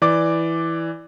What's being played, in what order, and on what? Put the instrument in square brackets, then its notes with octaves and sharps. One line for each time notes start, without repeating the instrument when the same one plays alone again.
[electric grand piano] E3 D5 D6